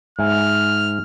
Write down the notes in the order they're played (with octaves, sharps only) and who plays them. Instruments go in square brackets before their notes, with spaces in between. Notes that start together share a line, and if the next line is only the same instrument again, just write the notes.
[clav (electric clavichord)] G#2 E5 G#5 [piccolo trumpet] F6